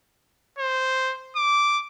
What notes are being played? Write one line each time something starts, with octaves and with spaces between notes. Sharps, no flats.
C5
D6